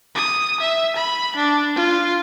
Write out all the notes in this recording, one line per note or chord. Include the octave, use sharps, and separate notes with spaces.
D#6
E5
B5
D4
F4